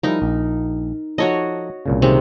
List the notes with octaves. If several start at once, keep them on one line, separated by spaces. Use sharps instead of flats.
F3 G3 D#4 E4 A#4
A#1
F3 D#4 F#4 A4 C#5 D#5
C2 A#2 C#3
C3 D#3 G#3